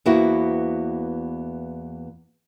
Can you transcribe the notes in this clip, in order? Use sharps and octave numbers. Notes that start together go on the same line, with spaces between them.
E2 A#3 B3 E4 F#4 C5